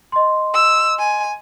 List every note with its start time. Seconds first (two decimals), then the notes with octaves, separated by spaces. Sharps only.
0.12 D#5 C6
0.54 E6
0.99 G#5